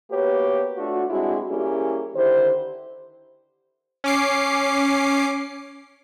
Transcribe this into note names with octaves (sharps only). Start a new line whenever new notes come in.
A#3 B3 F#4 G4 B4 C#5
A3 D4 F4 F#4
G3 G#3 C4 D4 E4 F#4
G3 A#3 C#4 E4 G4 G#4
D3 D#3 E4 G4 C5
C#4 D6 C7